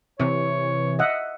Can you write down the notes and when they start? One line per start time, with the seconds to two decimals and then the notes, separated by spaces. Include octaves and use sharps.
0.20 C3 E3 C#5
0.99 D#5 E5 F#5